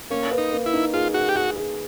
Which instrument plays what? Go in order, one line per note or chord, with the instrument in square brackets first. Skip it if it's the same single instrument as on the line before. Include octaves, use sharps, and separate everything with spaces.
[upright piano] A#3 [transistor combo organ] C#4
[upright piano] B4
[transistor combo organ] D#4
[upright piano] A#3
[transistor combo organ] E4
[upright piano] D#4
[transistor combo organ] F4 [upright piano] G#4
[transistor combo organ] F#4 [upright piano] G#4
[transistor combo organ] G4
[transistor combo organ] F#4 [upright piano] G#4
[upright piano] G#4